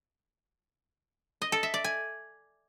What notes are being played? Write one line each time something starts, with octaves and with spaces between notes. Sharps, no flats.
D#5
A4
E5
D5
G#5